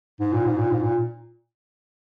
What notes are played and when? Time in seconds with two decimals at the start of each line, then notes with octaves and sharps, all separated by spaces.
0.20 G#2
0.33 A#2
0.45 G#2
0.58 A#2
0.70 G#2
0.82 A#2